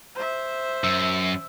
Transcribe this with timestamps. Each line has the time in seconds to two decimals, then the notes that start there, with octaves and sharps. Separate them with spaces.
0.15 C5 E5
0.84 F#2 E6